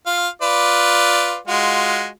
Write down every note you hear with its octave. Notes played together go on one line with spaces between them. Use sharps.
F4 F5
F4 B4 D5
G#3 F4 F#4